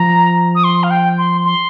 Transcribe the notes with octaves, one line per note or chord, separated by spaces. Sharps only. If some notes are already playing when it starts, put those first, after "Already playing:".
Already playing: F3 A#5
D#6
C6
F5
G5
C6
C6